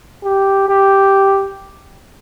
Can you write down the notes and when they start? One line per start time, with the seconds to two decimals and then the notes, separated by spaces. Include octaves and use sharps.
0.24 G4
0.69 G4